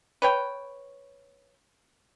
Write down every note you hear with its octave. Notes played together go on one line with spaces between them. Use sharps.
B4 C#5 G5